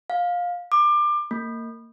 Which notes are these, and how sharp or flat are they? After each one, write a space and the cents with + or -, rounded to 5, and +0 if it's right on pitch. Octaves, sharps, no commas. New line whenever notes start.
F5 +15
D6 +25
A#3 -25